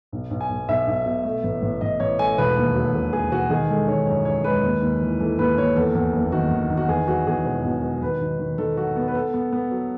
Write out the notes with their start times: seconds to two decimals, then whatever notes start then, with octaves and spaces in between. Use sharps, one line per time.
0.12 B1
0.31 B1
0.41 G#5
0.50 B1
0.68 B1 E5
0.87 B1
1.06 B2
1.24 A3
1.44 A1
1.62 A1
1.81 A1 D#5
2.00 A1 C#5
2.19 A3 G#5
2.38 E1 B4
2.57 D#2
2.75 F#3
2.94 E1
3.13 F#3 G#4
3.32 E1 F#4
3.50 D#3 G#4
3.69 G#3 A4
3.88 D#3 C#5
4.06 F#2 C#5
4.25 F#2 C#5
4.44 G#3 B4
4.64 D#2
4.82 D#2
5.01 E3
5.20 E3 A4
5.39 D#2 B4
5.57 D#2 C#5
5.76 E2 A4
5.95 E2
6.13 F#1
6.32 D#3 F#4
6.51 D#3
6.70 D#3
6.77 F#4
6.88 E2 G#4
7.08 F#3 F#4
7.27 E2 G#4
7.45 E1
7.64 B2
7.83 F#3
8.02 D#3 B4
8.21 D#3
8.39 D#3
8.58 D#3 A4
8.76 F#3 F#4
8.96 B3
9.08 B4
9.15 B3 A4
9.34 B3
9.52 B3
9.71 F#3